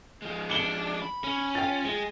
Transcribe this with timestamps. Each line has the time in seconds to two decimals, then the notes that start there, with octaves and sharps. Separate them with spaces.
0.22 F3 G#3
0.50 D4 C#7 F#7 G7
1.02 B5
1.24 C#4
1.55 F4 G5 A6
1.85 G#3